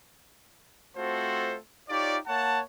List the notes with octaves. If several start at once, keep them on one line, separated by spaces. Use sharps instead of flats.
A3 C4 F4 F#4 A4 C5
D#4 F4 G4 C#5 D5
A#3 C#5 F#5 A5